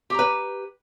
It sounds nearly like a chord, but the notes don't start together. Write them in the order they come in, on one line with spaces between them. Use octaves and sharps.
G4 A#5 B4